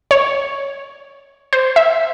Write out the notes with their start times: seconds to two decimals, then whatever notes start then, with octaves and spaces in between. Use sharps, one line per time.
0.11 C#5
1.53 C5
1.76 E5